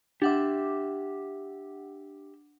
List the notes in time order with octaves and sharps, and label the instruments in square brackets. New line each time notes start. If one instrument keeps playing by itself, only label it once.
[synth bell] D4 F#5 D6 [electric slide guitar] G4 E5